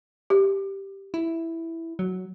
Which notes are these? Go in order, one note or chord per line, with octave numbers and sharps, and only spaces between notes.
G4
E4
F#3